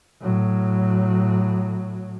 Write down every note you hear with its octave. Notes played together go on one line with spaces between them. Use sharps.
A2 F#3